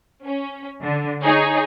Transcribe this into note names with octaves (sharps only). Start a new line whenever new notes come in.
C#4
D3
D#4 G#4 C#5